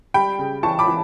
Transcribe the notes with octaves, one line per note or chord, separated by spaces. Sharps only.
G3 G5 B5
C#3
E3 A5 C#6
B5 D6
E3